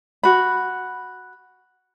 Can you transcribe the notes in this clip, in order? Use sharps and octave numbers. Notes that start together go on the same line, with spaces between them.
F#4 B5